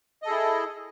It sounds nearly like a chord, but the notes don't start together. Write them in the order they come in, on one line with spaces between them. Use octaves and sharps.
D#5 A4 G#4 E4